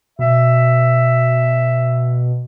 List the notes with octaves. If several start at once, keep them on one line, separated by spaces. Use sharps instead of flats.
B2 E5